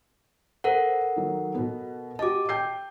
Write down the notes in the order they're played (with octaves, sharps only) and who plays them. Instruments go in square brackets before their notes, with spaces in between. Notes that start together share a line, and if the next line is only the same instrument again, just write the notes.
[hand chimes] A4 A#4 F#5 [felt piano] C5
[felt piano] D#3 F#3
B2 B3
[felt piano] F#4 G4 D#5 [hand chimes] A5 D6
[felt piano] G5 G6 C7